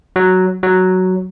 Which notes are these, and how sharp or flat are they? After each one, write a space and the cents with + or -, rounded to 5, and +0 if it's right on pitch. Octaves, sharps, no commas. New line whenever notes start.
F#3 +5
F#3 +5